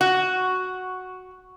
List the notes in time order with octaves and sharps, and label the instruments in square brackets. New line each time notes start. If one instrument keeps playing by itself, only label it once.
[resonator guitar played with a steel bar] F#4